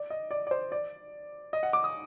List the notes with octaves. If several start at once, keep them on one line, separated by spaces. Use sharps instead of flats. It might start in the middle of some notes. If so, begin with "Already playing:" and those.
Already playing: D5
D#5
D5
D5
C5
D5
D#5
F#5
D6
D#6